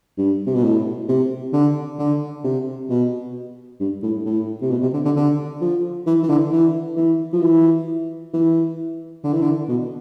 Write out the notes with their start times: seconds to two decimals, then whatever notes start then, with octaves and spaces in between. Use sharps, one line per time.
0.18 G2
0.47 C3
0.55 B2
0.63 A2
1.08 C3
1.53 D3
1.99 D3
2.44 C3
2.89 B2
3.80 G2
4.03 A2
4.25 A2
4.61 C3
4.71 B2
4.82 C3
4.93 D3
5.05 D3
5.16 D3
5.61 F3
6.06 E3
6.23 E3
6.29 D3
6.52 E3
6.97 E3
7.33 F3
7.42 E3
8.33 E3
9.24 D3
9.33 E3
9.42 D3
9.69 B2